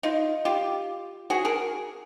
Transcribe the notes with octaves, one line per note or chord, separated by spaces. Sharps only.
D#4 F4
F4 G4
F#4 G#4
G#4 A#4